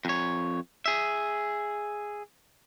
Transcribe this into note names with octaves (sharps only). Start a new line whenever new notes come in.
F2 C#5
G#4 E5